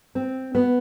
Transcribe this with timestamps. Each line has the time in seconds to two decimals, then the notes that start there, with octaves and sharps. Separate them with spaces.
0.15 C4
0.55 B3